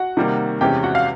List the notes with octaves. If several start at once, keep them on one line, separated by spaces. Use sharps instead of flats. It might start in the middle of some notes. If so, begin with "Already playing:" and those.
Already playing: F#4 F#5
C3 D#3 G3 A#3
E2 C3 E3 G#3 C#4 G4 G5
F#4 F#5
F5